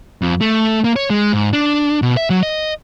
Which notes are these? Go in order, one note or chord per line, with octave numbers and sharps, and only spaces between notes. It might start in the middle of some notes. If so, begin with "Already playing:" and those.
F2
A3
A#3
C#5
G#3
G#2
D4
B2
E5
F#3
D#5